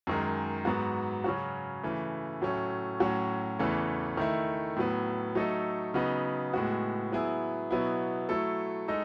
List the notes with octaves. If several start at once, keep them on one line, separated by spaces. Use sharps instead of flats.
F#2 D#3 G#3
G#2 F#3 B3 F#4
C#3 F#3 C#4 F#4
C#3 E3 A3
A2 F#3 A3 C#4
A2 F#3 C#4 F#4
E2 C#3 E3 A3
D#3 A3 E4
A2 F#3 B3
F#3 A3 D#4 A4
C#3 F#3 B3 D#4
A2 G#3 B3 F#4
F#3 B3 E4 G#4
B2 F#3 B3 E4
F#3 A3 E4 A4
G#3 D#4 A4